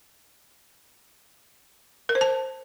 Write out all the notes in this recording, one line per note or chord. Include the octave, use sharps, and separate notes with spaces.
A#4
C5
A5